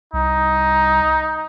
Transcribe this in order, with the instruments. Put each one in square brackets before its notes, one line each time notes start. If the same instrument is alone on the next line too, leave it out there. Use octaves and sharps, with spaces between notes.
[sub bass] C2 [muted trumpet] D#4